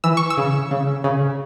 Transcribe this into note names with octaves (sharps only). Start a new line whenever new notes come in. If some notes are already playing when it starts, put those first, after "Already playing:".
E3 E6
C#6
E6
C#3
C#3
C#3